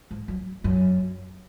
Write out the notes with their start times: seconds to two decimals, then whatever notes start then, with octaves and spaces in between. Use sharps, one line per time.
0.11 G#2
0.28 F#2
0.64 F#2